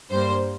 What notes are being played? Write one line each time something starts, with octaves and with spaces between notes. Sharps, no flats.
G2 G3 A#3 C5